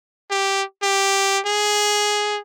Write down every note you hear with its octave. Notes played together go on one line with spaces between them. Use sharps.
G4
G4
G#4